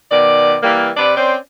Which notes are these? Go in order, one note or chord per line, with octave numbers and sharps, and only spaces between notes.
B2 D#3 D5
E3 G3 A#3
C3 B4 D5
C4 C#4 C5 D5